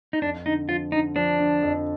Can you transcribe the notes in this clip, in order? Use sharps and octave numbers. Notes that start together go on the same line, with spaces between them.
D#4
F2 D4
D3 D#4
F3 F4
D3 D#4
F3 D4
D3
F2